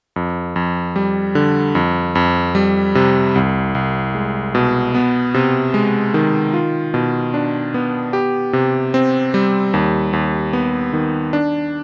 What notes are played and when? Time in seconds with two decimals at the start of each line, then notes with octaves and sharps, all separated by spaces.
0.16 F2
0.56 F2
0.96 G3
1.35 D3
1.75 F2
2.15 F2
2.55 G3
2.95 C3
3.36 C2
3.75 C2
4.15 G#3
4.55 B2
4.95 B3
5.34 C3
5.74 G#3
6.14 D#3
6.54 F4
6.94 B2
7.34 D4
7.74 B3
8.13 G4
8.53 C3
8.94 C4
9.34 G3
9.74 D#2
10.13 D#2
10.53 B3
10.93 D#3
11.33 D4